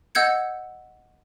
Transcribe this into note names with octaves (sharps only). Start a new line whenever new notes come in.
D#5 F#5 E6 G6 G#6 C#7